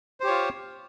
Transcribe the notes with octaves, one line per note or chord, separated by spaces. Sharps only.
F4 G4 C5 C#5